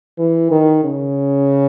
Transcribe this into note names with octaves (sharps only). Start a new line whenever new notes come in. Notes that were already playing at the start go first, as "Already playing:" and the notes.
E3
D#3
C#3